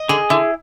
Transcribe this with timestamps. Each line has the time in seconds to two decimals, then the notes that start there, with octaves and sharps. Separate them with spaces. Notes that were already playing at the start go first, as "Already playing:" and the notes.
Already playing: D#5
0.09 D3 G#4
0.30 D3 E4